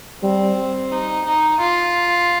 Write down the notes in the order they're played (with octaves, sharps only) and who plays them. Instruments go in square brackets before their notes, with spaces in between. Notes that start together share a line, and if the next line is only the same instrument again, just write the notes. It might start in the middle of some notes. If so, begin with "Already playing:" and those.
[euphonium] G3 [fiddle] C4
[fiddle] D#4
D#4
F4